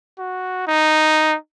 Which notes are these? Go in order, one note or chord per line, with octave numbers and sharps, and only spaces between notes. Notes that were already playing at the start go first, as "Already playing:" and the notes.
F#4
D#4